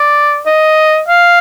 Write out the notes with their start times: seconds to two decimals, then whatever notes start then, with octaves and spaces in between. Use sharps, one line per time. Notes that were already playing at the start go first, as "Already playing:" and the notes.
Already playing: D5
0.46 D#5
1.08 F5